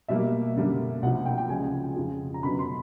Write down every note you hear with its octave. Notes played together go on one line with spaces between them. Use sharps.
B2 G3 A#3 E5
F#2 D3 G3 A#3
C2 C3 F3 F#5
G5
G5
C#2 C#3 F3 G#5
F2 C#3 F3
A#5
F#2 D3 F#3 B3 B5
C6